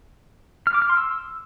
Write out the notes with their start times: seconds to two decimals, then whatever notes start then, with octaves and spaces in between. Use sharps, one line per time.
0.67 F6
0.74 D6
0.82 F6
0.89 C6
0.97 E6